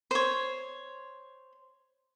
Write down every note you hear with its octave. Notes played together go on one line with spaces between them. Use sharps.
C5 C#5